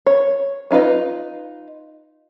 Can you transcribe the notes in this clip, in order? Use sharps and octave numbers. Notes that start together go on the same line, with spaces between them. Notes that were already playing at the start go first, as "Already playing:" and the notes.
C#5
C#4 D#4 F4 B4 D#5